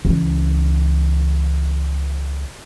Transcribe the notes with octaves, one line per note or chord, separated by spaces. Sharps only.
C#2 E3